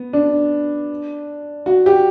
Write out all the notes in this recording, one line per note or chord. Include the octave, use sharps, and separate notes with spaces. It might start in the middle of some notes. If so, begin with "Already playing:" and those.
Already playing: B3
D4
F#4
G4